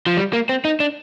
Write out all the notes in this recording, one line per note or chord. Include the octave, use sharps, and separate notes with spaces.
F3
G3
A#3
C4
D#4
D4